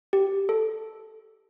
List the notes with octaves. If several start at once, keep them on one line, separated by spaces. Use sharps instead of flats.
G4
A4